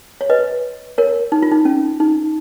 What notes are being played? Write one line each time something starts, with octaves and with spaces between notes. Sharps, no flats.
C#5
B4 D#5
A#4 C#5
D#4
F4
D#4
C#4
D#4